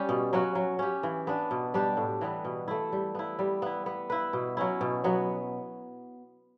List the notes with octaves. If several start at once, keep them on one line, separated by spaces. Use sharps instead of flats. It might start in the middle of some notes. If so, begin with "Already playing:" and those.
Already playing: G3 C#4 G4
B2
F#3 C#4 F#4
F#3
C#4 G4
E3
B3 D4
B2
G3 D4 G4
A2
E3 G3 B3
B2
A3 E4
G3
B3 E4
G3
B3 E4
B3
E4 B4
B2
F#3 C#4 E4
B2
F#3 B3